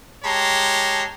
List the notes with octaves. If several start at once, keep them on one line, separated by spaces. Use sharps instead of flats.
G#3 G4 C#5 A5 A#5 C6